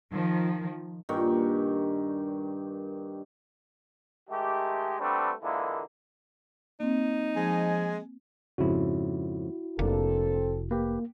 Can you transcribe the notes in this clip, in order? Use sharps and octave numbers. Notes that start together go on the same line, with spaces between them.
D#3 F3
G2 A#2 D#3 C#6
D#3 G#3 A3 G4
G3 A3 B3 C4 D4
A#2 D3 E3 G#3 A#3 E4
A#3 C4 D#4
F3 G#3 G#5
F2 G#2 C#3 E4 F#4
F1 A#3 C4 D4 A4
A#3 G4 B4